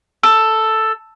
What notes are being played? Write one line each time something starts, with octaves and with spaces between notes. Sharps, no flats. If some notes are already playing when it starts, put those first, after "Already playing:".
A4